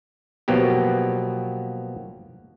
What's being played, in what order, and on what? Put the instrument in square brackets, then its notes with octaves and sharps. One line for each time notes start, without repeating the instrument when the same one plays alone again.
[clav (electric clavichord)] B2 F3 F#3 A#3 B3 G4